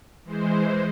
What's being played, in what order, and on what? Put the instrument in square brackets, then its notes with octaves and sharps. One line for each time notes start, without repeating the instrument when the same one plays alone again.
[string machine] E3 G#3 C5